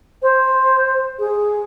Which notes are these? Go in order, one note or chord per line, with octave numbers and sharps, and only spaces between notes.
C5
G#4